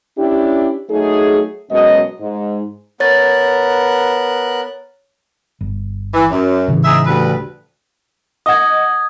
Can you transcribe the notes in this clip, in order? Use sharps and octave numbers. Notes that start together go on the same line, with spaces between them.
C#4 D4 E4 G4
F#3 A3 D#4 G#4
F#2 B2 F#3 G#3 D#5
G#2
B3 A#4 C#5 F#6 A6
G1
E3
F#2
A2 C#3 E3
G#2 G#4 E5
D2 G3 B4
D#5 F#5 D#6 G#6